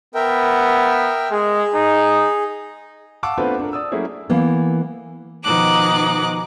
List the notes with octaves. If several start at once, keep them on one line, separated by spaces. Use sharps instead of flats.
B3 A#4 E5 G5
G#3 G#4
D#4
F5 F#5 A5 C#6 D6 E6
A3 B3 C4 D4 F4 B4
D4 A4 A#4
D5 D#6 E6
F#3 A3 A#3 C#4 E4 G#4
E3 A#3 B3
B2 D#3 F3 D#4 D6 F#6